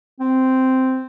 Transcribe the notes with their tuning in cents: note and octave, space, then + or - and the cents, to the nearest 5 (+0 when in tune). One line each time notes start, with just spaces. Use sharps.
C4 -5